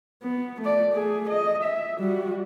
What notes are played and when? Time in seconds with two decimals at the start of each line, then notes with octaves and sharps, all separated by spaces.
0.23 B3
0.61 A3 D5
0.93 A3 G#4
1.30 D#5
1.64 E5
1.99 G3 F#4